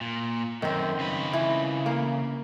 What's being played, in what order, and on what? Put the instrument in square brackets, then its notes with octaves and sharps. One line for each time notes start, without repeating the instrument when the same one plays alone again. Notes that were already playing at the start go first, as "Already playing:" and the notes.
[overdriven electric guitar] A#2
[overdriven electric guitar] F#2 [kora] D#3 C4
[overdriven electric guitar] C#3 B4
[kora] E3
A#3